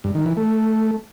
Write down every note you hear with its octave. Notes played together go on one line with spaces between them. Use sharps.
G2
D#3
E3
A3